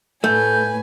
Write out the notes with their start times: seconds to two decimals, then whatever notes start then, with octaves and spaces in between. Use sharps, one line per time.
0.24 A2 A3 B4 G#5 G6